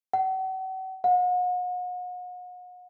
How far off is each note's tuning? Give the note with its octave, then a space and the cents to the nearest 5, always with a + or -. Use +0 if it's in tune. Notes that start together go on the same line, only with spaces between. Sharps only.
F#5 +40
F#5 -40